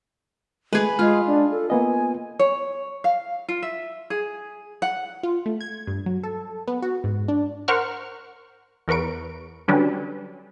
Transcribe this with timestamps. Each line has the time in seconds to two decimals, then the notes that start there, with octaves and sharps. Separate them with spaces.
0.73 G#3 A3 G#4 B4
0.99 G#3 F4 F6
1.27 D4
1.52 A4
1.70 A#3 B3 D#5 G#5
2.39 C#5
3.04 F5
3.48 F4
3.62 E5
4.10 G#4
4.82 F#5
5.23 F4
5.46 A3
5.61 G#6
5.87 G2
6.06 F#3
6.23 A4
6.68 B3
6.82 F#4
7.04 G#2
7.28 D4
7.68 A#4 C5 F#5 C#6 F6
8.88 E2 A#4 B4 C#6 D7
9.68 D3 F#3 G3 C#4 D4 B4